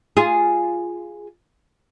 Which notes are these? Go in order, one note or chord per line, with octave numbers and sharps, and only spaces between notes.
F4 G#4